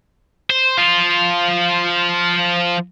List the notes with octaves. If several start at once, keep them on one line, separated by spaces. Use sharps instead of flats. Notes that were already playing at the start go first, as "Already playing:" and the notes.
C5
F3 F4